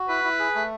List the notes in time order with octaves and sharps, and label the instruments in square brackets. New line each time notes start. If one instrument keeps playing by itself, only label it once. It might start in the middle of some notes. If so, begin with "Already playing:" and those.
Already playing: [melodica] F#4
[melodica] E4 [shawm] B4
[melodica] E4
G#4
A3